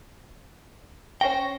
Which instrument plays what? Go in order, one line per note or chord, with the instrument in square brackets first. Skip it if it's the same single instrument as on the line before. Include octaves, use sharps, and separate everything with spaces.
[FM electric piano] C#4 C#6 A#6 [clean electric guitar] C5 G5